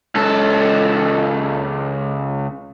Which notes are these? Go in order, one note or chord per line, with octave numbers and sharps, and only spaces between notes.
C#2 A4